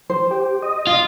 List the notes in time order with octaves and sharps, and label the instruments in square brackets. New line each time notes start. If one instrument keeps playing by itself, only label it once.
[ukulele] C5
[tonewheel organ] G4
D#5
[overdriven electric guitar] F4